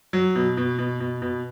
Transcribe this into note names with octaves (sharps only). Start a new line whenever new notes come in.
F#3
B2
B2
B2
B2
B2